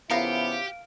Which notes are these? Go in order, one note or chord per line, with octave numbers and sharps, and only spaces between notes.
C#3 F3 B3 E4 G4 A#4 F5